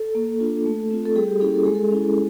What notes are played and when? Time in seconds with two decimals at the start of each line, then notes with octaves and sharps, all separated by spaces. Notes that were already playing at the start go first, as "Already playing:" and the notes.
Already playing: A4
0.15 A#3
0.40 D4 F4
0.66 A3
0.91 C4 F4
1.06 A4
1.16 G3 G#4
1.28 G4
1.41 A#3 C#4 E4 G#4
1.54 A4
1.64 G#3 G#4
1.75 A4
1.91 C#4 E4